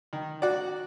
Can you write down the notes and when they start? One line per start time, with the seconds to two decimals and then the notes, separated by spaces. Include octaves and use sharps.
0.13 D#3
0.42 F#4 D5